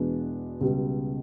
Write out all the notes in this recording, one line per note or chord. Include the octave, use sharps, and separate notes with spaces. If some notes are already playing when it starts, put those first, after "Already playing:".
Already playing: E2 B2 G#3 B3 D4
C#2 B2 G3